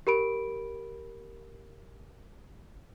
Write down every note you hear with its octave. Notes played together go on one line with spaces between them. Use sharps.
G4 A#4 B5 D7